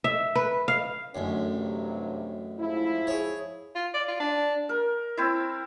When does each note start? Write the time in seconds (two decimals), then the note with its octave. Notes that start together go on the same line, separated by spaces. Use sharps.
0.04 E5
0.35 B4
0.68 F5
1.15 A1 F#2 D3 C#4
1.53 G2 C3 F#3
2.59 G#2 F3 E4
3.07 G#4 C#5
3.76 F4
3.94 D5
4.08 F4
4.20 D4
4.69 A#4
5.17 C4 E4